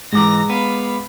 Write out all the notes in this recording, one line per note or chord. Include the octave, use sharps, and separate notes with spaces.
G#2 E3 G#3 A#5 D6 A#6
B3 F5 B5